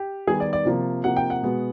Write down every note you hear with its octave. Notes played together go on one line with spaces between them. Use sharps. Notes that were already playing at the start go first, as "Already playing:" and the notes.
Already playing: G4
D#3 G3 B3 G#4
D5
D5
C3 F3 A#3
C3 F3 A#3 F#5
G5
F#5
B2 G#3 B3